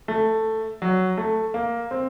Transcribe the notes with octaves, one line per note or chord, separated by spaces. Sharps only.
A3
F#3
A3
A#3
C4